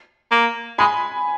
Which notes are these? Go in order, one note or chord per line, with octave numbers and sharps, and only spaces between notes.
A#3
G#3 G#5 B5